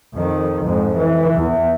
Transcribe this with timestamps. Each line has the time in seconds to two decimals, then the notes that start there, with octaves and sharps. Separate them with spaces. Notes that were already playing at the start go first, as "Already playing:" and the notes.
0.14 F2 D#3
0.64 F2 G#2
0.96 E3
1.35 E2